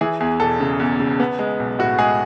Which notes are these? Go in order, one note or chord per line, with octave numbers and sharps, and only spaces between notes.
E3 G#4
E2 G#4
E1 A4
C#3
E2
C#3
B3
G#3
B1
A2 F#4
G#3 G#4